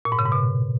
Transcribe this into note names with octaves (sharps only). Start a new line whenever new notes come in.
A#2
G#2
C#3
G#2
B2